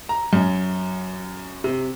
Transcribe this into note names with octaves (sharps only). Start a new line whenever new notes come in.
A#5
F#2
C3